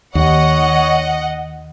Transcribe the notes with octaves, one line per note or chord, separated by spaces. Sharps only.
D#2 C#5 D#5 F#5